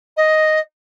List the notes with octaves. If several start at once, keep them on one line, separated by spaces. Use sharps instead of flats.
D#5